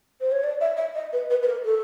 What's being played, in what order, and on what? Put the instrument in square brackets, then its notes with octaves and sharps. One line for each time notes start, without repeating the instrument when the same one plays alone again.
[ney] C5
C#5
D5
E5
E5
D#5
B4
B4
B4
A#4
A4